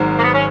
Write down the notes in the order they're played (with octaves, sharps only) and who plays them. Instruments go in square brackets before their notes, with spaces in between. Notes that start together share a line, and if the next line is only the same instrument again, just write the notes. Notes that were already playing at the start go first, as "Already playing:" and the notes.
Already playing: [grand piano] G#1 G#2 D#3 F#3
[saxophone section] A#3
B3
C#4